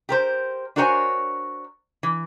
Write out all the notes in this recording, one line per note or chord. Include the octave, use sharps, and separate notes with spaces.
G4 A#4 C5
D4 F#4 A#4 C5 C#5 G#5
E3